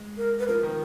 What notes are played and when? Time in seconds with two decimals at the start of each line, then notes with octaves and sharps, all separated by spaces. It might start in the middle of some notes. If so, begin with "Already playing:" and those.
Already playing: G#3
0.17 A#4
0.39 B4
0.47 F3 A#4
0.63 D#3